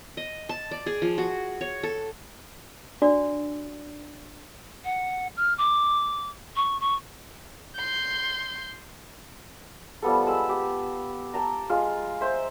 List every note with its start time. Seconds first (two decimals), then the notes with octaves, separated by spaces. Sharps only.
0.17 D#5
0.49 A5
0.71 D5
0.86 G#4
1.02 F3
1.18 F#4
1.61 C#5
1.83 A4
3.02 D4 F#4 D5
4.85 F#5
5.37 F6
5.58 D6
6.56 C#6
6.80 C#6
7.75 C6 G6
10.02 F3 G3 B3 A4
10.26 G#3 A5 B5 E6
10.49 G4
11.34 G5 A5 A#5
11.70 G#3 F4
12.21 C5 E5